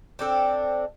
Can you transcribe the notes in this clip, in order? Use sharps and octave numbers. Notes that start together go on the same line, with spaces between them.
C4 D4 A4